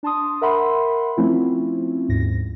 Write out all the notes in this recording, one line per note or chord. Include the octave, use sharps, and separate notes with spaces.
D4 A5 C6 D#6
A#4 E5 F#5 B5 C6
F3 A3 C4 C#4 E4 F4
D#2 G#2 A#6